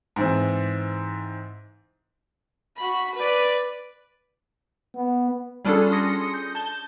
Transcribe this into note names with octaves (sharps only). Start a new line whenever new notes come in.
G#2 E3 C4
F#4 B5
B4 D5
B3
G3 C#4 D4 F4 G#4 A4
C6 D#6 A#6 C#7
G6
A5 G6 G7